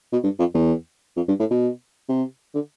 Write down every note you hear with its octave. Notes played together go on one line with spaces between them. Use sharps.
B2
G2
F2
E2
F2
G2
A2
B2
C3
D3